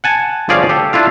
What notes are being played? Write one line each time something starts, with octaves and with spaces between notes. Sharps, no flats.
F#5 G#5 A5
G1 F3 C#4 G#4 D5 F5
G4 A4
D4 E4 F4 F5